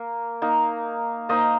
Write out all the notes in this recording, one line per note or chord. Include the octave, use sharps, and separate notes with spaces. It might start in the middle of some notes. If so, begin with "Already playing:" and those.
Already playing: A#3
A#3 D#4
A#3 D#4 C5 D#5